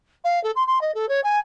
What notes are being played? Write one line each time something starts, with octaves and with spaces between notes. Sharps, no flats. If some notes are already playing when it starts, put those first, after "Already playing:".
F5
A4
C6
C6
D#5
A4
C#5
G#5